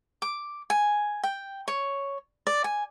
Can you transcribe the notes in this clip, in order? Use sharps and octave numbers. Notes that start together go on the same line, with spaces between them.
D6
G#5
G5
C#5
D5
G#5